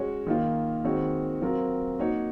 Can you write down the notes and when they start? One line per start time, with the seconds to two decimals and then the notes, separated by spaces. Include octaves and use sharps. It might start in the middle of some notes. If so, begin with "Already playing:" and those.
Already playing: G#3 C#4 F#4 C#5
0.27 D#3 A#3 F4
0.84 D#3 G#3 C4 F#4 C#5
1.41 F#3 C4 F4 A#4
1.99 A#3 D#4 F#4 C#5